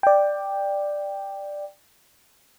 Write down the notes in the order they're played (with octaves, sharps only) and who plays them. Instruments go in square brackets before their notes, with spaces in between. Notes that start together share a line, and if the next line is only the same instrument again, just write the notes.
[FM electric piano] D5 G5